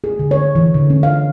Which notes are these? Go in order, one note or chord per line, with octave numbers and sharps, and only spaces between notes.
G#4
D3
C#5
E3
D3
C#4
F5